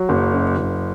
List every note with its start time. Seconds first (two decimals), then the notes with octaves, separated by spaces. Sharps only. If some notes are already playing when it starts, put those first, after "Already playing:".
Already playing: F#3
0.09 F#1
0.33 F#2
0.57 F#1